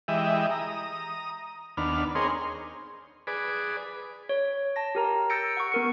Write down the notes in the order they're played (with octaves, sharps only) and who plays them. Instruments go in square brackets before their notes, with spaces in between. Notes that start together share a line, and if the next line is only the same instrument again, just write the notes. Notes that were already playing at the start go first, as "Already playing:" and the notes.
[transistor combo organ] E3 G#3 G4 D#5 E5
A#5 D#6
D#2 B3 D4 F6
C4 D#4 G#4 A#4 C#5 C6
G#4 B4 D5
[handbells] C#5
A5 A#6
G4 A#4 A#5
E6 G6 A6 A#6 C#7 D7
F#5 C#6
B3 A#4 C#7